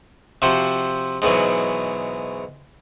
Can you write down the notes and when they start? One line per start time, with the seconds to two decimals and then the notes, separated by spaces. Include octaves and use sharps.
0.42 C3 F3 F#4 C5
1.22 G#2 B2 E3 F#3